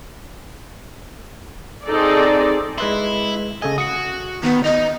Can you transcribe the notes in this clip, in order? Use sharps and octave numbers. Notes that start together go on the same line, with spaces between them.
C4 D#4 G#4 A4 D5
G#3 E4 B4 C6
C#3 A4 D#5 G#5
F#4 D#6 C#7
D#3 B3
D#4 D#5